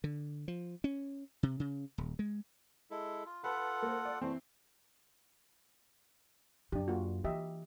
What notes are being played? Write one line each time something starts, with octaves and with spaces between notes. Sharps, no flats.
D3
F3
C#4
C3
C#3
D#1
G#3
G#3 E4 A4
F4
F4 A4 B4 F#5 A5 B5
A#3 C5
D5
E3 A3 C4
F#2 D4 G4
A#3 F4 F#4
E3 G4 D#5 E5